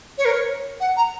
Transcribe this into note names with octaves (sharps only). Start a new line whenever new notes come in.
C#5
A#4
C#5
F#5
A#5